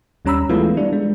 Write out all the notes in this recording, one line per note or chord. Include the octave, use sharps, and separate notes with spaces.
D#2 G3 C#4 A#5 B5 E6
E3 G#3 A3 B3 E4 F4
G3 D4
G#3